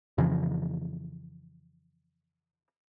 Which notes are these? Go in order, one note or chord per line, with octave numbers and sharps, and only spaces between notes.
F2 C#3 E3 F3